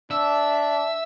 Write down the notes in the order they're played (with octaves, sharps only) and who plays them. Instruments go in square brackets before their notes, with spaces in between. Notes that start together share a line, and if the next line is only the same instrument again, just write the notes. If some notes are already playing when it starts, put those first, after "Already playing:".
[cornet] D4 [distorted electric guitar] E5